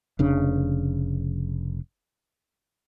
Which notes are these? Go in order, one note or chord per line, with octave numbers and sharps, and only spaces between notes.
F1 C#3 D4